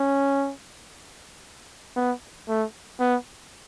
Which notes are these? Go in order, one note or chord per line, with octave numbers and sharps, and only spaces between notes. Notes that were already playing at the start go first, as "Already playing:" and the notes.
Already playing: C#4
B3
A3
B3